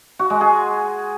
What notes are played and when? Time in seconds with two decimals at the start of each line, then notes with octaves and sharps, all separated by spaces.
0.19 F#4
0.30 G#3
0.41 G#4